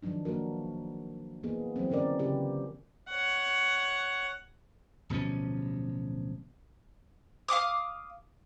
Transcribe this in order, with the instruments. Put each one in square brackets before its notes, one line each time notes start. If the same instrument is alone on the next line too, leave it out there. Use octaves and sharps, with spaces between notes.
[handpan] D#3 F3 F#3 D4 D#4
A#3 D4 F#4 A#4
E3 A#3 B3 G#4
E3 F#3 C4
D3 E3 C#4 A#4 D5
C#3 F4 G4 B4
[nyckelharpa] C#5 F#5
[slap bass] D1 B2 F3 C#4
[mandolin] F5 F#5 D6 D#6